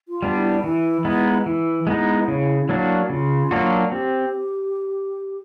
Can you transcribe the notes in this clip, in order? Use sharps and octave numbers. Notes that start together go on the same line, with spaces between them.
F4
G3 B3 D4
E4
E3 E4
G#3 B3 D#4
E3 E4
G#3 B3 D#4
C#3
F#3 A#3 D4 F#4
C#3 F4
F#3 A#3 D4 F#4
C4 G4